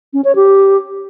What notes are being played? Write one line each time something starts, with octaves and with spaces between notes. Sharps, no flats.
C#4
C#5
G4